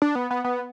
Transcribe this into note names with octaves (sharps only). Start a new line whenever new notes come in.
D4
B3
B3
B3